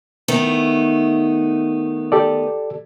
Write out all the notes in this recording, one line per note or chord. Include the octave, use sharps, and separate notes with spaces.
D#3 A3 B3
G4 A4 D5